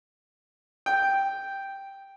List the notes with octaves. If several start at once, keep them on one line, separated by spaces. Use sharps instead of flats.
G5